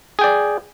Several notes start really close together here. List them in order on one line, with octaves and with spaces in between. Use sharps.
G#4 G5 D5